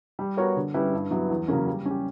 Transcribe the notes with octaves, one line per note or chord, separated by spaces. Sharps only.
G3
B3 F#4 A#4 C#5
D3
G3 C#4 E4 B4
G2
F#3 B3 E4
E2
C#3 F#3 A#3 C#4
G3
C#4 G4